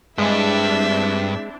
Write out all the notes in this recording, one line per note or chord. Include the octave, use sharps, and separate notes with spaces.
G2 G#3 C4 D4 E4 E5